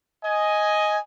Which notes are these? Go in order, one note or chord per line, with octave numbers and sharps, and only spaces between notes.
D#5 G#5